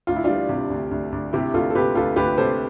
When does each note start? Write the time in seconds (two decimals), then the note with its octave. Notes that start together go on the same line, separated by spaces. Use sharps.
0.07 D2 F4
0.16 E4
0.24 G3 D4 F4
0.49 C3
0.70 D2
0.91 D2
1.12 D2
1.33 C3 E4 G4
1.54 D2 F4 A4
1.70 A4
1.75 C3 G4 B4
1.95 D2 F4 A4
2.16 D2 G4 B4
2.38 C3 A4 C5